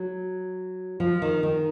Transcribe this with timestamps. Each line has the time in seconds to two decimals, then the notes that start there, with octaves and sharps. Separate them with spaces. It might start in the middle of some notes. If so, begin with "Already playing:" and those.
Already playing: F#3
1.00 F3
1.22 D#3
1.43 D#3